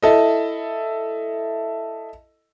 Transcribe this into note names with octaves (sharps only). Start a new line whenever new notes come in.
E4 A4 D#5